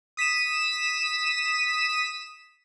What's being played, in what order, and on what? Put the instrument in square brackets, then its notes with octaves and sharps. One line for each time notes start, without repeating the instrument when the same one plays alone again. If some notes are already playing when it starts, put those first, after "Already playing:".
[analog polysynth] D#6 B6 D#7 E7